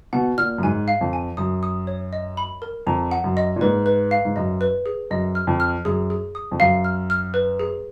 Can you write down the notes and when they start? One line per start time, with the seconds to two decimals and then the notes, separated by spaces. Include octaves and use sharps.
0.13 B2 F#5
0.38 A#2 F6
0.58 F#2
0.63 G#2 G#5
0.88 F5
1.01 F2
1.13 G#5
1.37 F#2 D#6
1.63 D#6
1.87 C#5
2.13 D#5
2.37 B5
2.62 A#4
2.87 F2 A#5
3.11 F#5
3.24 F#2
3.37 D#5
3.56 A#2
3.61 G#2 B4
3.86 B4
4.11 F5
4.25 G#2
4.36 F#2 D#5
4.61 B4
4.86 G#4
5.11 F#2 D#5
5.35 F6
5.47 F2
5.60 F6
5.85 F#2 G#4
6.10 G#4
6.35 D#6
6.52 F2
6.60 F#2 F5
6.84 F6
7.10 F6
7.34 B4
7.60 G#4